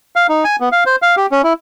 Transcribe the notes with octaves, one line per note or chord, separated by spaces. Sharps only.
F5
D#4
G#5
B3
F5
C5
F5
G4
C#4
E4